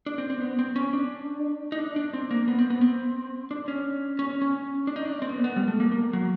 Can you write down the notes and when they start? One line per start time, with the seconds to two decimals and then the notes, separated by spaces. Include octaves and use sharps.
0.06 D4
0.18 C4
0.30 C4
0.41 B3
0.59 C4
0.76 C#4
0.93 D4
1.72 D#4
1.78 D4
1.96 D4
2.13 C4
2.31 A#3
2.48 B3
2.59 C4
2.70 B3
2.81 C4
3.51 D4
3.68 C#4
4.19 C#4
4.30 C#4
4.42 C#4
4.87 D4
4.96 D#4
5.05 D4
5.13 C#4
5.22 C4
5.29 B3
5.37 A#3
5.44 B3
5.56 G3
5.68 A3
5.80 A#3
5.92 A#3
6.13 F#3